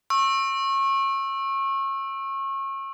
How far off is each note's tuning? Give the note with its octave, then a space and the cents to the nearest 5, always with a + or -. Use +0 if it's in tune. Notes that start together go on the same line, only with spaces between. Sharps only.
C#6 -30 E6 +0